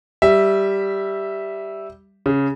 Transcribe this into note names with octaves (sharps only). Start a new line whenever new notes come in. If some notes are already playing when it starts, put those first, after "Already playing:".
G3 E5
C#3